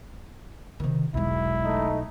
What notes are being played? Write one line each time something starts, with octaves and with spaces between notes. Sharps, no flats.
C3 D#3
E1 B1 G#3 E4
A3 D#4